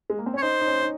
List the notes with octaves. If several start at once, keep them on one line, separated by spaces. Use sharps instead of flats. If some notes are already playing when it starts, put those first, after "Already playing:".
G#3
A#3
C4
C#4
C#5
D#4 C5
D#4
C#4
D#4